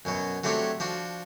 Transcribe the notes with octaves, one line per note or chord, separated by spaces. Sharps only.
F#2 B2 F#3
F#3 A3 C4 D4 G4 C#5
F3 D4 F#4